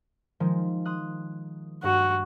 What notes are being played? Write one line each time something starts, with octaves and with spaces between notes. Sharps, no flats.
D#3 F3 G#3
C6 D#6 F#6
G2 F#4